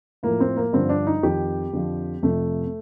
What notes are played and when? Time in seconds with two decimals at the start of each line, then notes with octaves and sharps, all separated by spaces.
0.23 A2 F3 A#3
0.40 C4
0.56 A#3
0.73 G2 D3 F3 C4
0.89 D4
1.07 D#4
1.23 F2 D#3 G4
1.73 F2 D3 F3
2.22 F2 C3 F3 A3